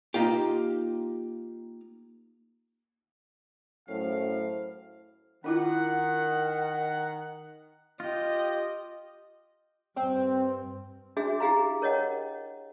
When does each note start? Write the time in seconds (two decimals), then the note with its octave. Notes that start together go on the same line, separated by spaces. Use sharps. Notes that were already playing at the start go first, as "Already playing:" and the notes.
0.14 A#3 D#4 F4 G4
3.88 F#2 A2 C5 F5
5.44 D#3 D4 E4 F4 F#5
8.00 F4 G4 D#5
9.96 G2 C4
11.17 D4 F#4 G#4 E5
11.40 E4 G4 G#4 F5 A#5
11.82 A#4 C#5 D#5 F#5 G5